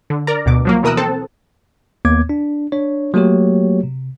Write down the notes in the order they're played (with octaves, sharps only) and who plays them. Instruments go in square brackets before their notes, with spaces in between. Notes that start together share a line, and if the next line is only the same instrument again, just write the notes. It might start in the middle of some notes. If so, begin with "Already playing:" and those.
[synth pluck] D3
A#4 D5 A#5
D2 B2 D6
F3 F#3 A#3
B2 E3 A#4 D#6 E6 F#6
C4 A4 A5
[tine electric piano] D#2 A#3 B3 D6 G#6
D4
D4 C#5
F#3 A3 A#3 F#4 G4 C#5
C3